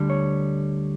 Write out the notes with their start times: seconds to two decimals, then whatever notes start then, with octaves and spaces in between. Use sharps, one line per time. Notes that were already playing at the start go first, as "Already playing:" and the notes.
Already playing: D2 D3 G3
0.10 C#5